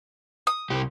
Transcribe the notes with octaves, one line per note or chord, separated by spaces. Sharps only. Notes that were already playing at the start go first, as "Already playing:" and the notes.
D#6
C2 G4